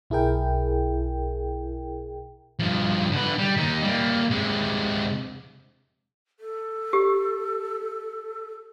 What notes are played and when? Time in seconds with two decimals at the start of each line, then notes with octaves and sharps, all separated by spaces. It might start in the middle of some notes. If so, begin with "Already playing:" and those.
0.10 B1 E4 G#4 A#4 G5
2.59 G2 F3
3.12 D3 B4
3.38 G3
3.57 D#2 D#4
3.83 G3 A#3
4.31 C3 G#3
6.40 A4
6.93 G4